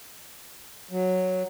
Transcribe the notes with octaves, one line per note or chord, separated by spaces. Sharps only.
F#3